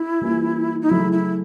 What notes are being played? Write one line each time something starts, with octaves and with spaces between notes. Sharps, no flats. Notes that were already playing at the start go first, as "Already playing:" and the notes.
Already playing: E4
E3 G3 A#3 C#4 F4
D#4
C#3 F#3 A3 E4
E4